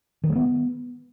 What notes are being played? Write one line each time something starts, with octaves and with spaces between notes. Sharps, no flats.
D#3
G#3
B3